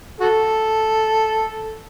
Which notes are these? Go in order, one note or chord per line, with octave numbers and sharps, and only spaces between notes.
F#4 A4